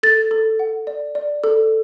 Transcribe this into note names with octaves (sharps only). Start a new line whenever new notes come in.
A4 A6
A4
F#5
D5
D5
A4